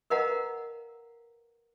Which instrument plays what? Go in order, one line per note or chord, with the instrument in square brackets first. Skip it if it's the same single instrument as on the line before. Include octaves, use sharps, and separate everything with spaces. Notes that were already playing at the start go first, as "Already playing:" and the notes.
[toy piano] A#4 B4 D#5 F5 F#5 A#5